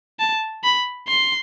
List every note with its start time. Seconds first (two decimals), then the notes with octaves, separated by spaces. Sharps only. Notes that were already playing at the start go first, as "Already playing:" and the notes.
0.19 A5
0.64 B5
1.08 C6